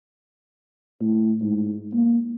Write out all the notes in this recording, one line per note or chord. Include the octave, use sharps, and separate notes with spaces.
A2
G#2
A#3